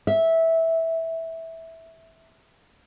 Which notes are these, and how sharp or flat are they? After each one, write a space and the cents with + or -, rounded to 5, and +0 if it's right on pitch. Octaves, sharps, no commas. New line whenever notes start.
E5 -10